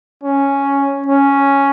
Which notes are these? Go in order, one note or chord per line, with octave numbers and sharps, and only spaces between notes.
C#4
C#4